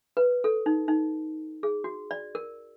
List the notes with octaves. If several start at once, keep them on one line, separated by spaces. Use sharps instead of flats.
B4
A4
D#4
D#4
G#4
F#4
D5
A#4